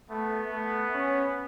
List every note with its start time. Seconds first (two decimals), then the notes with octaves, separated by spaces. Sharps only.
0.10 A3 B3
0.53 A3
0.94 C#4